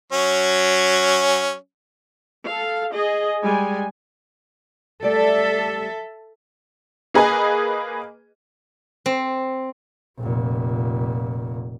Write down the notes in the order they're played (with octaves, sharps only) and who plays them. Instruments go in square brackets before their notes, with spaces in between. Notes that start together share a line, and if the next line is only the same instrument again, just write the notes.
[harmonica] F#3 C#4
[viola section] A4 F5
G#4 D#5
G3 G#3 G#5
[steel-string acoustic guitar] G3 A3 D5 [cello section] A4 E5
[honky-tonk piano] A#3 G#4 B4 D#5 G#5
[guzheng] C4
[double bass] F1 A#2